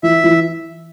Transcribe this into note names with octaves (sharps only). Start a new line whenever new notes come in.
E3 E5
E3